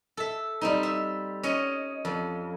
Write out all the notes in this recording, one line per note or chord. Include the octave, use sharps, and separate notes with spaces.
A4 E5
G3 C4 D#4
E5
C#4 C#5 D#5
F2